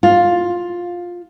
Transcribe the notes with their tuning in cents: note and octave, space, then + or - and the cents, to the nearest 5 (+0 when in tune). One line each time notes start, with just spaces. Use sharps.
F4 +10